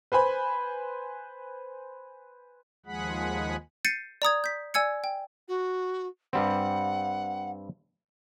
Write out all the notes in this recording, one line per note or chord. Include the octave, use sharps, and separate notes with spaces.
B4 C5 G#5 B5
D#2 F3 G#3 G#4 F#5 B5
G6 A6 C7 C#7 D#7
D5 A#5 D#6 G#6
G6 B6
D5 G#5 E6 G#6 C#7
G5
F#4
G2 G3 C4 F#5